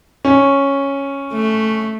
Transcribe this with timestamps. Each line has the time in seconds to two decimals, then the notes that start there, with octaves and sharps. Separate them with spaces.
0.25 C#4
1.33 A3